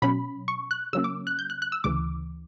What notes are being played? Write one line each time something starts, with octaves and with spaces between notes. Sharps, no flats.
B2 F#3 C#4 B5
C#6
F#6
C#3 F#3 A#3 C#4 E6
D6
F#6
G6
F#6
F#6
E6
D2 C#3 E3 D6